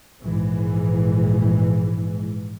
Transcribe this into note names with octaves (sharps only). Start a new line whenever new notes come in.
A#1 G#2 E3 G#3